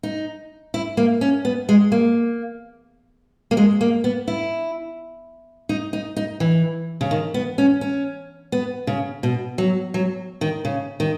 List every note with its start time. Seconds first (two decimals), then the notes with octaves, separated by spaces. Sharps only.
0.03 D#4
0.74 E4
0.97 A#3
1.21 C#4
1.45 B3
1.69 G#3
1.92 A#3
3.51 A#3
3.57 G#3
3.81 A#3
4.04 B3
4.28 E4
5.69 D#4
5.93 D#4
6.16 D#4
6.40 E3
7.01 C#3
7.11 D#3
7.34 B3
7.58 C#4
7.81 C#4
8.52 B3
8.87 C#3
9.23 B2
9.58 F#3
9.94 F#3
10.41 D#3
10.65 C#3
11.00 D#3